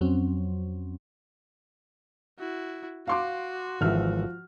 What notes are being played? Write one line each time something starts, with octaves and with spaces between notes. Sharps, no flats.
F2 F#3 C4 C#4
E4 F#4
F#4 F5 C6 D6
G#1 E3 F3 E5 F6